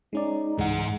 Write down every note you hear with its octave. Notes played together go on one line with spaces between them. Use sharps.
G#3 C#4 D#4 D5
C#2 G#2 E3 G#3 F#5